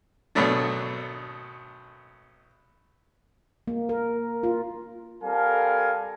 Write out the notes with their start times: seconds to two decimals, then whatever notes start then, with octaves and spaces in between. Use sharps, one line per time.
0.35 G#1 B2 F#3 A3 D4
3.67 A#3
3.89 A#4
4.43 F4
5.23 G3 C4 A4 A#4 F5 G#5